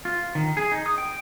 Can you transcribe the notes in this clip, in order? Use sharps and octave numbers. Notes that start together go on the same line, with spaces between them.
F4
D#3
G#4
D#4
D#6
G5